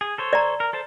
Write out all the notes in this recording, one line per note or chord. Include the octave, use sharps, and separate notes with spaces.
G#4
A4 C5 C#5
D5 A#5
A#4
A4 C5 A5